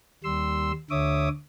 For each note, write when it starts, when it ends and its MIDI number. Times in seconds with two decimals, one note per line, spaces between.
0.24 0.72 39
0.24 0.72 55
0.24 0.72 84
0.24 0.72 88
0.91 1.29 38
0.91 1.29 50
0.91 1.29 73
0.91 1.29 76
0.91 1.29 86
0.91 1.29 87